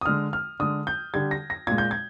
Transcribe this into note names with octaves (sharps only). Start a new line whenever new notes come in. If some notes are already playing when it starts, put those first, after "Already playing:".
D#6
D3 G#3 F6
F6
D3 G#3 D#6
G6
D3 G3 G#6
A#6
A#6
A#2 G#3 G#6
G6
G#6